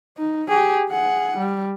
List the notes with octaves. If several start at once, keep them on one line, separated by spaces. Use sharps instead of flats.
D#4
G4 G#4
G#4 F#5
G3